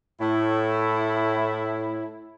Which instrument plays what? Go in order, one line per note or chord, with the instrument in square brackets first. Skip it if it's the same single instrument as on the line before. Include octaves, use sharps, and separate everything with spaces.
[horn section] A2 E4